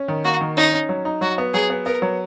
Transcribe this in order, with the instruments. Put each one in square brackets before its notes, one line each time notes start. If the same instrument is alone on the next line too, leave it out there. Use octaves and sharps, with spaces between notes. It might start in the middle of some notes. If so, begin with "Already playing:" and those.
Already playing: [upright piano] C#4
D#3
[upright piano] A#3 [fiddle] F#4
[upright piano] D#3
[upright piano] C#4 [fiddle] D#4
[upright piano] C#4
F#3
D#4
[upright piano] F#3 [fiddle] F#4
[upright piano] B3
[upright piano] F#3 [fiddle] G#4
[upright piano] B3
[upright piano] B3 [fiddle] A#4
[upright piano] F#3